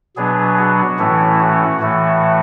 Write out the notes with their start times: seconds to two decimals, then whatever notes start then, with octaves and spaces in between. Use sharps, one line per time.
0.16 B2 F#3 B3 D4 G#4
0.58 F#4
0.99 A2 E3 A3 C#4 E4
1.40 F#4
1.80 A2 E3 A3